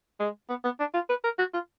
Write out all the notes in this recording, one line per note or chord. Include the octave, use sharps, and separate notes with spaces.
G#3
B3
B3
D4
F4
B4
A#4
F#4
F4